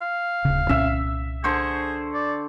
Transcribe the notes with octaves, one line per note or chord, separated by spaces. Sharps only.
F5
D1 C#3
C2 A#2 C#4 E5
D3 G#4 C5 C#6
D5